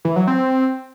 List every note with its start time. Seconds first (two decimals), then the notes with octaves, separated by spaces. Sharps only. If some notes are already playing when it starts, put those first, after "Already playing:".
0.05 E3
0.16 F#3
0.27 C4